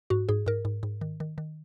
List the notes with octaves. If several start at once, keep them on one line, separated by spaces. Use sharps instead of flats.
G#2 F#4
G#2 G#4
G#2 A#4
G#2
G#2
D#3
D#3
D#3